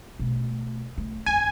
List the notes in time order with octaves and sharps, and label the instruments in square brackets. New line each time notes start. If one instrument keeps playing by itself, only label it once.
[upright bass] B2 A3
A3
[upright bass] G1 F2 [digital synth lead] G#5